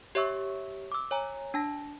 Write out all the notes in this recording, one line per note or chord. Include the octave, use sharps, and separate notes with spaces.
G4 C#5 E5 C#6 E6
D6 E6
C#5 G#5 A#5
D4 A5 A#6